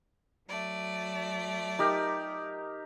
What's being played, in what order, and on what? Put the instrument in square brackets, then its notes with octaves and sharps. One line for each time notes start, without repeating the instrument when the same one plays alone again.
[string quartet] F#3 A3 D5
[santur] D#4 G4 A#4